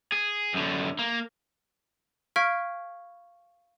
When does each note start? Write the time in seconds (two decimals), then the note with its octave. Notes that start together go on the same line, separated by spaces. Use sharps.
0.12 G#4
0.54 F#2 D3
0.99 A#3
2.36 F5 C#6 F6 G#6 B6 D7